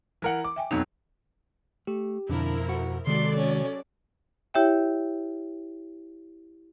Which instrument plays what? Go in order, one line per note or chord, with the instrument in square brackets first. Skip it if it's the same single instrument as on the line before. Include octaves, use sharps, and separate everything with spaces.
[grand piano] E3 A#4 F#5
D6
[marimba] E5 G5 G#5
[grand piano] F2 B2 F#3 [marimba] D#4
[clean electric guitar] A3 [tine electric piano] G4
[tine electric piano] F2 B2 [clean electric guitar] D3 D4 [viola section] F3 E4 A#4
[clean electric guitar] F#4 F#5
[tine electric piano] C3 [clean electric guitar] D#3 G#3 [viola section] F#3 A4 D5 [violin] C6
[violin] C#4
[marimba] E4 G4 C#5 E5 G5